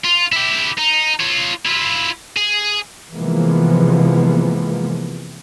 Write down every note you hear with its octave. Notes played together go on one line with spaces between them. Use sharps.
F4
E4 G4
D#4
F4 C#5
E4 F4
G#4
C3 E3 F3 G#3 A#3 B3